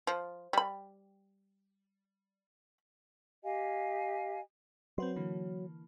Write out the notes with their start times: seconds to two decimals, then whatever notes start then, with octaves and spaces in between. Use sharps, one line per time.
0.07 F3
0.53 G3 B5
3.43 G4 D#5 F5 G#5
4.98 F#3 C4 B4 C6
5.16 D3 E3 A#3